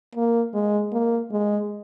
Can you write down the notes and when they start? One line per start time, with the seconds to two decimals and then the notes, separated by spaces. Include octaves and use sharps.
0.15 A#3
0.54 G#3
0.92 A#3
1.31 G#3